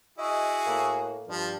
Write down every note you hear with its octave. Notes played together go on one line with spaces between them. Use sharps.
E4 F#4 G#4 D#5
A2 A#3
G2 F3